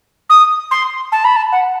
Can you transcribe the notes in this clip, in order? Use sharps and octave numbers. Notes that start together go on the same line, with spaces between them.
D#6
C6
A5
B5
A5
F#5